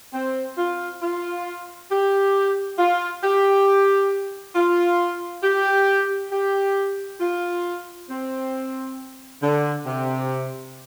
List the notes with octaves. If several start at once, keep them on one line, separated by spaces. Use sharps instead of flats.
C4
F4
F4
G4
F4
G4
F4
G4
G4
F4
C4
D3
C3